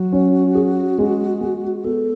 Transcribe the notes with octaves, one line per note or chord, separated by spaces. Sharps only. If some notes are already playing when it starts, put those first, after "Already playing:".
Already playing: F#3 F#4
C#4
G#4
G#3
G#3
B3 A4